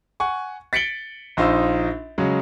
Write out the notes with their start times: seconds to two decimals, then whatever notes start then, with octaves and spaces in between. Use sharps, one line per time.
0.20 F#5 G#5 C#6
0.73 A6 B6 C#7 D7 F#7 G7
1.37 A#1 D#4 F4 C5 E6
2.18 C#3 F#3 G#3